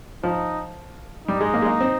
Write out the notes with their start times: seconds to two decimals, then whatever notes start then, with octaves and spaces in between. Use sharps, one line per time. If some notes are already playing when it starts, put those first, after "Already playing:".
0.23 F3 D#4
1.27 G3 D#4
1.41 G#3
1.54 A#3
1.62 G#3
1.66 A#3
1.81 C4